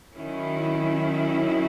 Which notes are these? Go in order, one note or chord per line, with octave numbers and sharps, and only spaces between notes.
D#3 F#3 C#4 E4